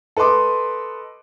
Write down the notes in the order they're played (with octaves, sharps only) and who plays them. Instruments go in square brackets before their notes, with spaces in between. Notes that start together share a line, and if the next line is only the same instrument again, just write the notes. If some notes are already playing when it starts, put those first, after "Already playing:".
[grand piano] A4 B4 D#5 C6 D6